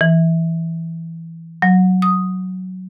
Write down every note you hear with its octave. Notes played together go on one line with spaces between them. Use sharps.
E3
F#3
D#6